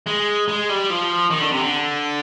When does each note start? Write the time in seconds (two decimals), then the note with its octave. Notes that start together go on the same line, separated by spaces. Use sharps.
0.07 G#3
0.48 G#3
0.69 G3
0.90 F3
1.31 D#3
1.40 D3
1.51 C3
1.60 D3